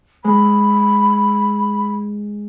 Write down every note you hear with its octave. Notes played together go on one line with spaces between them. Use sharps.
G#3 B5